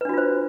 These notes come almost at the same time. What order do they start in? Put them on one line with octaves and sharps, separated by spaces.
B4 D4 F#4 F4 C5